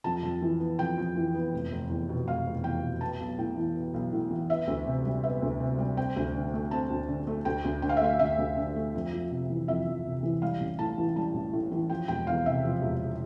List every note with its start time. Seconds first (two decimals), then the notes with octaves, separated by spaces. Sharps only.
0.04 F2 A5
0.23 F2
0.42 E3
0.60 B3
0.79 F2 G5
0.98 F2
1.16 E3
1.35 B3
1.53 F1
1.72 F1
1.90 E2
2.09 B2
2.27 F1 F5
2.46 F1
2.64 E2 G5
2.82 B2
3.01 B3 A5
3.20 B1
3.38 A2 G5
3.56 E3
3.75 B3
3.94 B1
4.13 A2
4.31 E3
4.49 B3 E5
4.67 D2
4.86 C3
5.05 G3
5.23 B3 E5
5.42 D2
5.60 C3
5.78 G3
5.97 C4 G5
6.16 D2
6.34 D3
6.54 A3
6.71 C4 A5
6.90 D2
7.08 D3
7.27 A3
7.45 D2 G5
7.65 D2
7.82 D3 G5
7.89 F5
7.97 E5
8.01 A3 F5
8.19 D2 E5
8.38 D2
8.57 D3
8.76 A3
8.94 F2
9.13 F2
9.31 C3
9.50 E3
9.68 F2 E5
9.86 F2
10.05 C3
10.23 E3
10.42 G3 F5
10.60 A1
10.79 A2 A5
10.98 E3
11.16 G3 A5
11.34 A1
11.53 A2
11.71 E3
11.90 F3 G5
12.08 E1 G5
12.27 E2 F5
12.46 C3 E5
12.65 F3
12.82 E1